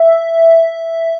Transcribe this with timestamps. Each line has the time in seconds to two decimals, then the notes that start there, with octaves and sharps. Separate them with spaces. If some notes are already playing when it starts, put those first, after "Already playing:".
Already playing: E5